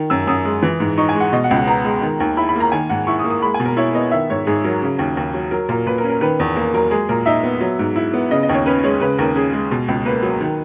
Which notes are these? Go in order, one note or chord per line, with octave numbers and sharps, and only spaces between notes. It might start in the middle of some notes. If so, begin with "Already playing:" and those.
Already playing: D#3
F#2 E6
F#2 D#6
G#3
E3
G#2
D#4 C#6
G#5
G#3
F#5
B2 D#5
F#5
C#2
F#5
B3 A#5
G#3
D#3
D#2
E4 B5
B5
A#3 A#5
D#3 G#5
G#2 F#5
E4 C#6
D#6
A#3
D#6
G#3 B5
G#5
B2
A#4
E4 C#5
B3 D#5
D#3 E5
G#2 C#5
G#2 G#4
F#3 A#4
C#3
D#2
D#2
F#3
F#3 A#4
A#2 A#4
A#2 B4
A#4
C#4
A#4
D#3 B4
E2
A#3 A#4
F#3 A#4
G#3 G#4
A#2 A#4
D#4 E5
B3
F#3
G#2
E4
B3
C#3 D#5
D#5
D#2 C#5
C#4 B4
G#3 C#5
C#3 B4
D#2 A#4
C#4 G#4
G#3
B2
C#2
A#3 B4
F#3
D#3